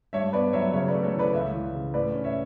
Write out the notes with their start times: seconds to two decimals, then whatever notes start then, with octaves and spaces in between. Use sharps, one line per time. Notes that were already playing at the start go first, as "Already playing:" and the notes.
0.13 G2 C#5 E5
0.33 B3 B4 D5
0.53 F#3 C#5 E5
0.73 C#3 C#5 E5
0.88 B4 D5
0.94 A3
1.03 A4 C#5
1.14 E3
1.19 B4 D5
1.34 C#2 C#5 E5
1.54 E3
1.75 C#3
1.94 A2 B4 D5
2.14 C#4
2.24 C#5 E5